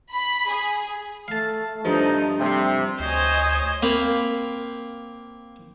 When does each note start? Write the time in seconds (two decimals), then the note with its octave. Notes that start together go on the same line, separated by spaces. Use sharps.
0.12 B5
0.51 G#4
1.28 A3 F5 A5
1.85 G2 F3 A3 D#4
2.40 C3 G3 C6
3.00 D2 C5 C#5 D#5 G#5
3.82 A#3 C4 F5 B5